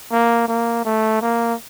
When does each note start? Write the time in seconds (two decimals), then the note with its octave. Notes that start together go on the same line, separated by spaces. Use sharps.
0.12 A#3
0.48 A#3
0.85 A3
1.21 A#3